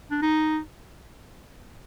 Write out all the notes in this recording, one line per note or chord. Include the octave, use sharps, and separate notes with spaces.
D4
D#4